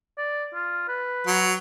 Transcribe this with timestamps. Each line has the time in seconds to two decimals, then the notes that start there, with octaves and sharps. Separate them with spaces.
0.18 D5
0.54 F4
0.88 B4
1.27 F#3